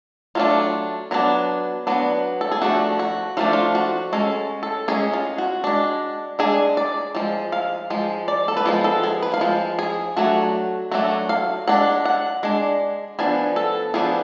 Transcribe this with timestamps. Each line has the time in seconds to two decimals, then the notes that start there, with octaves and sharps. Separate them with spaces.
0.35 F#3 A3 D4 F4
1.11 F#3 B3 D4
1.87 F#3 B3 D4
2.41 A4
2.51 G#4
2.62 F3 A3 D4 F#4
2.99 F#4
3.37 F3 A3 D4 F4
3.53 F4
3.75 F#4
4.13 G#3 C#4 A4
4.63 A4
4.88 G#3 C#4 G#4
5.13 F4
5.38 F#4
5.64 G#3 D4
6.39 G#3 D4 G#4
6.77 D5
7.15 F3 G#3
7.52 F5
7.90 F3 G#3
8.28 D5
8.48 A4
8.57 B4
8.66 F3 G#3 B3
8.84 A4
9.03 G#4
9.22 B4
9.34 F5
9.41 F3 G#3
9.79 G#4
10.16 F#3 A3 D4 F#4
10.91 F#3 A3 D4 F#4
11.29 F5
11.67 G#3 D4 F#5
12.05 F#5
12.43 G#3 D4
13.19 F3 B3 D4 G#5
13.56 A4
13.94 F3 B3 D4 G#4